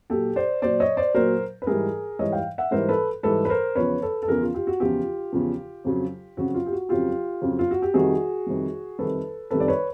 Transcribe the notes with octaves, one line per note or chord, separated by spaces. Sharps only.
A#2 F#3 G4 A4
C5 D5
A#2 F#3 C5 D5
C#5 D#5
C5 D5
A#2 F#3 A#4 C5
B4
G#2 E3 G3 G#4 A#4
G#2 E3 G3 C#5 D#5
F5 G5
E5 F#5
G#2 E3 G3 A#4 C5
A4 B4
G#2 E3 G3 A4 B4
B4
A#4 C5
E2 C#3 F3 B4 C#5
A4 B4
A4
E2 C#3 F3 G#4 A#4
F4
F4 G4
F#4
E2 C#3 F3 F4 G4
E2 C#3 F3
F2 C#3 F#3
F2 C#3 F#3 F#4
F4
G4
F#4
F2 C#3 F#3 F4 G4
F2 C#3 F#3
F4
F#4
G4
F2 C3 D#3 G3 F#4 G#4
F2 C3 D#3 G3
F2 C3 D#3 G3 A4 B4
F2 C3 D#3 G3 A4 B4
D5
B4 C#5